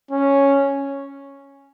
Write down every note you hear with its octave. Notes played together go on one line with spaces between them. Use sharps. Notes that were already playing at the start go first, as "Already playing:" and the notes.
C#4